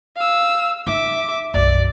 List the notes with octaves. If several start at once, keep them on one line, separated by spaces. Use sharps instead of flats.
F5 E6
D#4 E5 D6
B1 F#2 D5